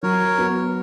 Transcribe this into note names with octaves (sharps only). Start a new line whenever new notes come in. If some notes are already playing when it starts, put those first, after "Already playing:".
F#3 A#4 C#5
B3 F#4